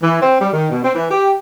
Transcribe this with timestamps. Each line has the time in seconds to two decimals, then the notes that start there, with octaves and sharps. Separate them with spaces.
0.02 E3
0.20 C4
0.40 G3
0.53 D#3
0.70 B2
0.83 C4
0.94 E3
1.10 G4